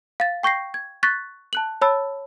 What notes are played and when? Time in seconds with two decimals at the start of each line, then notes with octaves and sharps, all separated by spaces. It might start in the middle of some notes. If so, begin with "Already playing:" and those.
0.20 F5 A6
0.43 G5 C#6 G6 A#6 C7
0.74 G#6
1.03 C#6 F#6 A6 B6
1.53 A5 F#6 F#7
1.82 C#5 A5 B5 E6 A6